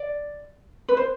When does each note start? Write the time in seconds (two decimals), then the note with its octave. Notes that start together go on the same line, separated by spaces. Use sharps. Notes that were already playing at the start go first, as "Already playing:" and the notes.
Already playing: D5
0.89 B4
0.97 C5